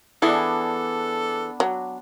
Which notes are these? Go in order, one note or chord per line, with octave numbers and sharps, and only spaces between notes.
E3 B3 D4 G#4 A4
F#3